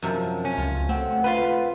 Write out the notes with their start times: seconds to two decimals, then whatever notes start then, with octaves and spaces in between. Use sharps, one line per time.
0.02 F#2 C3 F3
0.45 C#4
0.58 C#2 F4
0.89 A3 C4 F#5
1.24 F4 B4